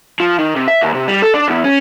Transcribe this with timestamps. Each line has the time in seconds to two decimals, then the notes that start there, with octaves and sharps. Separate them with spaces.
0.20 F3
0.38 D#3
0.56 C3
0.68 E5
0.82 D#2
0.94 C3
1.08 G3
1.22 A4
1.34 D4
1.48 E2
1.64 C#4